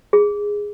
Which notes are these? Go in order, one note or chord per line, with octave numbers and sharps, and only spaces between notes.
G#4